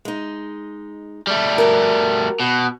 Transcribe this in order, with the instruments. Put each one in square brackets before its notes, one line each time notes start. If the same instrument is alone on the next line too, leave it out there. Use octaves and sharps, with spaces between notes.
[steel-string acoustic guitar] G#3 D#4
[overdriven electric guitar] G3 A3
[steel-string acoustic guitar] F#4 A#4
[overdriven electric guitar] B2